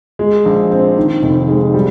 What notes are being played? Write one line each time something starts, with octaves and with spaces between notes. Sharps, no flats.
G#3
A#1
C4
D#3
F1
G#3
G3